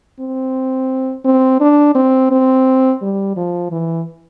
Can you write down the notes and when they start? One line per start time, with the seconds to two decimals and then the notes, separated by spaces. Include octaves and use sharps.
0.20 C4
1.25 C4
1.60 D4
1.95 C4
2.31 C4
3.02 G3
3.36 F3
3.72 E3